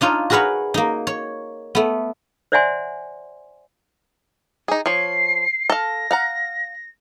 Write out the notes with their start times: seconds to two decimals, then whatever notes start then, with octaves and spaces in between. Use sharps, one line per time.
0.01 D4 D#4 F4 C#5
0.30 F#4 G#4 A#4 B4 C#5 F#5
0.74 A#3 D#4
1.07 C#5
1.75 A3 B3
2.52 C5 D5 E5 F#5 G#5 C6
4.68 D#4 G#4
4.86 F3 C#5 C7
5.70 A4 F5 A#6
6.11 F5 F#5 A#5